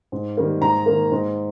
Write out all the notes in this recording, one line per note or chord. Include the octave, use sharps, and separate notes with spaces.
G#2
D#3 G3 A#3
G#2 A#5
D#3 A#3
G#2